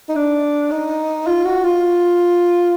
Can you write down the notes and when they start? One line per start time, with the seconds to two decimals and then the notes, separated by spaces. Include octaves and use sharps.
0.08 D#4
0.15 D4
0.71 D#4
1.27 F4
1.45 F#4
1.64 F4